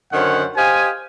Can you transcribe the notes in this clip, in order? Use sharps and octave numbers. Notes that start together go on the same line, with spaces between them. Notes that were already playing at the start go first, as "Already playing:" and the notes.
F#2 D3 D#3 C5 C#5 F#5
G4 C5 D#5 F5 G#5